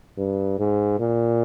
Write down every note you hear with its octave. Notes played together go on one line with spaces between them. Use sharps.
G2
G#2
A#2